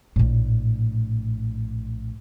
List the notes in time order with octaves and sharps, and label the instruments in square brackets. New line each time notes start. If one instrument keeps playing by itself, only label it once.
[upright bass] A#1 A2